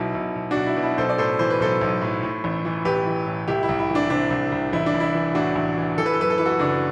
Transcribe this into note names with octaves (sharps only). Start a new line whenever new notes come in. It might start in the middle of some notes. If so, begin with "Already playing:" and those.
Already playing: B1 B2 E4
B1
B1
D4 F#4
B1
E4
B2
E4
B1 A4 C5
D5
A2 A4 C5
E3 C5
B4
B1 A4 C5
B1
A2
A2
A1
E3
A1 G4 B4
E3
A2
C2 E4 G4
E4
C2
E4
E3
D4
C3 D4
C2
C2
A1 E4
D4
A1
E4
E3
A2 D4 F#4
A1
E3
E3 A4
B4
A4
F#2 B4
A4
E3 B4
F#4 A4
F#1 D4 F#4